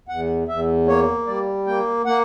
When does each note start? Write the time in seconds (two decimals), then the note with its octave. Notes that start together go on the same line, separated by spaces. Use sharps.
0.08 E2 F#5
0.48 E2 E5
0.86 A#3 C#5
1.27 G3 D5
1.67 A#3 G5
2.06 A#3 F#5